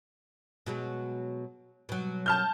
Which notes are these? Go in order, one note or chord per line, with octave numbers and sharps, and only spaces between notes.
B2 F#3 G#3
B2 F#3
A5 F6 G6